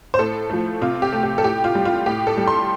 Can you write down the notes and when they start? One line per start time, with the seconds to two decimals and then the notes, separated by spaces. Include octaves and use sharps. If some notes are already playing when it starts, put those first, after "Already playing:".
0.14 C5
0.19 A2 A4
0.50 F3 A3
0.81 C3 F4
1.02 G4
1.13 A3
1.23 G4
1.38 A4
1.44 A2 G4
1.64 F4
1.75 G3
1.85 F4
2.06 A2 G4
2.27 A4
2.37 G3
2.48 C6